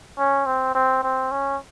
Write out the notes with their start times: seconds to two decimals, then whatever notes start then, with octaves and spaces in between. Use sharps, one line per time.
0.18 C#4
0.46 C4
0.75 C4
1.03 C4
1.31 C#4